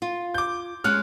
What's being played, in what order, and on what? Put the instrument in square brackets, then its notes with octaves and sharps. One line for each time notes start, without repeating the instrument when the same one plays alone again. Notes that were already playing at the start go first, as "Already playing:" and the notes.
[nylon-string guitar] F4
[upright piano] D6 G6
[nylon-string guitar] G#3 C#4 C#5 [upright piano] F6 F#6